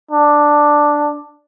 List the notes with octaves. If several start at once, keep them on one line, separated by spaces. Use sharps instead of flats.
D4